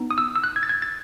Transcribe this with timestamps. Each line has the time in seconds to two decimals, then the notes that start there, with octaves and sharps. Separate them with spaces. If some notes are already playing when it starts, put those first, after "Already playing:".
Already playing: B3 D#4
0.11 D#6
0.18 E6
0.36 E6
0.44 F#6
0.56 G#6
0.63 A6
0.69 G#6
0.82 A6